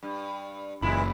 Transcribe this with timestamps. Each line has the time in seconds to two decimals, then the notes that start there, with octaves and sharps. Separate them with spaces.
0.03 G2
0.82 F#1 A#2 E3 G#3 A#3 E4 B5